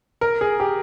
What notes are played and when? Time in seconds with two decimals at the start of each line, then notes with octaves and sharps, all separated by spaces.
0.21 A#4
0.41 G#4
0.60 G4